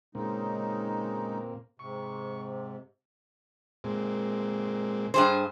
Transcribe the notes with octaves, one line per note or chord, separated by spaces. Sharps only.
A#2 C#3 G#3 A#3 C4 D#4
G#2 C3 C#6
A#2 G#3 C4
G2 G#4 C5